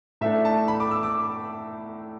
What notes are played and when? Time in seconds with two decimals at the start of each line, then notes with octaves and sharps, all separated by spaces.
0.21 A2 A3 D4 E5
0.45 A5
0.68 B5
0.80 D6
0.91 E6
1.03 D6